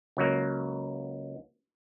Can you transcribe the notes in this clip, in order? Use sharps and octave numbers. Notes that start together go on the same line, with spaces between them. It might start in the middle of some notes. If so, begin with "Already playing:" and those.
C#2 F#3 A#3